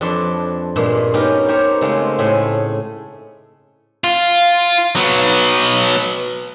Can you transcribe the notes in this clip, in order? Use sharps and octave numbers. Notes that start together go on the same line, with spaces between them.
F2 D4 A4 B4 E5 C6
G2 A#2 G#3
B3 C#4 D#4 F#4 G4 A#4
G4 A#4 C5 C#5
C#3 G#3 A3 C4
A2 A3 G#4 B5
F4
F#3 B3